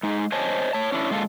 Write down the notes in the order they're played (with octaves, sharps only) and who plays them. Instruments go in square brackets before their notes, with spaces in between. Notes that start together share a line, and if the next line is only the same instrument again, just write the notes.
[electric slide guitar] G#3 D#4
C5 C#5 D#5 G#5 A5
C#5 A5
C#4 D4 E4
A#2 G#3 F4 A4